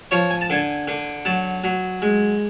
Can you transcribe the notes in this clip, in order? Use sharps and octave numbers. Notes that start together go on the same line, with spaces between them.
F3 C#5
G#5
A5
D3 G#5
D3
F#3 A5
F#3
G#3